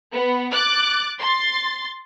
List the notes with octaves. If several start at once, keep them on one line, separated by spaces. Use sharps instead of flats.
B3
D6 F#6 A6
C6 A6